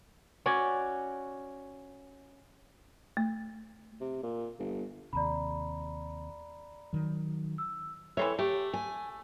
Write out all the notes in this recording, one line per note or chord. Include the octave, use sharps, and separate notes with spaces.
C#4 F#4 D5
A3
C3
A#2
G1
D#2 C3 D5 A#5 B5
D#3 F#3
E6
E3 C4 A4 C#5 E5
A3 G4
G#5